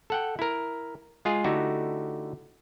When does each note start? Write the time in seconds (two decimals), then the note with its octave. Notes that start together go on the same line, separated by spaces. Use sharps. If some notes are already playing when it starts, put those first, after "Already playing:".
0.10 A4 F#5 G5
0.39 E4 A#4
1.25 G#3 F4 G#4
1.44 D3 A3 D#4 E4 F#4 G4